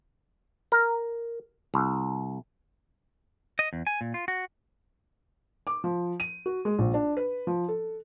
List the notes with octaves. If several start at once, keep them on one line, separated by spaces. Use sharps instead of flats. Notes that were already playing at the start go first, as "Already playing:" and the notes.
A#4
C2
D#5
E2
G#5
A#2
F4
F#4
D6
F3
D#7
F#4
G#3
A#1
D4
B4
F3
A4